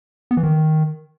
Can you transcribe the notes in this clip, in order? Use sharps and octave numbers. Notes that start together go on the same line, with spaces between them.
B3
E3
D#3